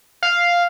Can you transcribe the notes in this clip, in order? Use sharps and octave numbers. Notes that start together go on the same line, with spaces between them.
F5